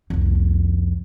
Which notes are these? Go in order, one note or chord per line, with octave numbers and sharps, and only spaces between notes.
C2 F2